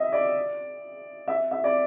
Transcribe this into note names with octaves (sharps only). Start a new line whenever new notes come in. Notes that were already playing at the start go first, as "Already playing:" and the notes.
Already playing: D#5 E5
D5
E5
E5
D5